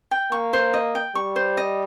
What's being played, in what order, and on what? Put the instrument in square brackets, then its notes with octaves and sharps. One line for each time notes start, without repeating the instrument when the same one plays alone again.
[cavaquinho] G5
[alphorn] A#3 [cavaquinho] C#6
[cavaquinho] C5
D#5
G5
[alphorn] G3 [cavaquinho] C#6
[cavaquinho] C5
D#5